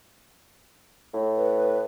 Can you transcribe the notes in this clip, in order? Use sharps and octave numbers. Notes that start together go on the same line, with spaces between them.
A2
B4